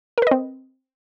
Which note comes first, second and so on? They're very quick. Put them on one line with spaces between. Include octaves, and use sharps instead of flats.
A#4 B4 D#5 C4